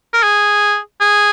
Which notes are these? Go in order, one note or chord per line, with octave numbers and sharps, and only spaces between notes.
A#4
G#4
G#4